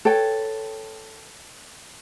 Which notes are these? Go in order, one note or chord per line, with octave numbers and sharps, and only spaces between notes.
A4 B4 C#5 G5